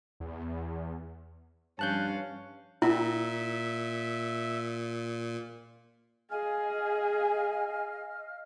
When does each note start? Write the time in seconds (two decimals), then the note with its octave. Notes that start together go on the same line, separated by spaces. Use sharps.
0.20 E2
1.79 G2 F3 C#4 F5 A5 F#6 G6
2.82 A#2 E4 E5
6.31 G#4 D#5 F5 G#5 F6